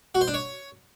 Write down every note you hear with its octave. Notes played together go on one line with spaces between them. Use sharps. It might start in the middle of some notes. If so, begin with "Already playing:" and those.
F#4
C5
D4
C#5